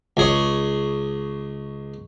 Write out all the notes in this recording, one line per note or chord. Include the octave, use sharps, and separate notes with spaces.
C#2 G#4 C#5